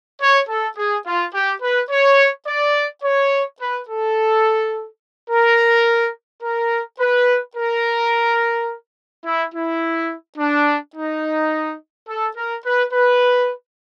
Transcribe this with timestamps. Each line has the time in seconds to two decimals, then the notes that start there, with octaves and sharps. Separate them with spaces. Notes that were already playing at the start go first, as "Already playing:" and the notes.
0.22 C#5
0.49 A4
0.78 G#4
1.07 F4
1.34 G4
1.62 B4
1.91 C#5
2.48 D5
3.04 C#5
3.61 B4
3.89 A4
5.31 A#4
6.43 A#4
7.00 B4
7.56 A#4
9.26 E4
9.55 E4
10.38 D4
10.96 D#4
12.09 A4
12.37 A#4
12.65 B4
12.93 B4